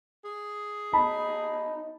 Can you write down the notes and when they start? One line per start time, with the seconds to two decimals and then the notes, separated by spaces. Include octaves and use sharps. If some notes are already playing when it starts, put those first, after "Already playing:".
0.25 G#4
0.93 D#4 A5 B5